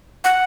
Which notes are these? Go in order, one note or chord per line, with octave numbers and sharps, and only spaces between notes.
F#5